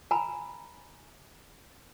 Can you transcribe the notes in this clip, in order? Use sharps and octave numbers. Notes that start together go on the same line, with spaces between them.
G#5 A#5 B5